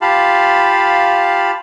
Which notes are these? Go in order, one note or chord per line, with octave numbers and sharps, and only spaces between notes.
F4 G4 F5 A5 B5